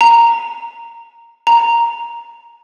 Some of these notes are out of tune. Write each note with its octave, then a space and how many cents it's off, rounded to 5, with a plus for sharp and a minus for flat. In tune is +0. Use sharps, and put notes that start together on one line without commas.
A#5 -5
A#5 +5